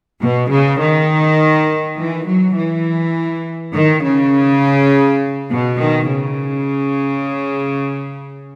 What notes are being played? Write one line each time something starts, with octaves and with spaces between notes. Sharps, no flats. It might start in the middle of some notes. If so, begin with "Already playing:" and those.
B2
C#3
D#3
E3
F#3
E3
D#3
C#3
B2
D#3
C#3